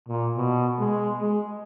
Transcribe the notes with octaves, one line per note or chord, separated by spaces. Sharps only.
A#2
B2
G#3
G#3